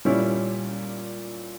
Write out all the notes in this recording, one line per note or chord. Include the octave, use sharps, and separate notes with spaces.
A#2 G3 C#4 E4